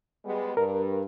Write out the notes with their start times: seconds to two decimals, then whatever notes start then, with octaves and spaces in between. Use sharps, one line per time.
0.24 G3 G#3 B3
0.57 G2 A#4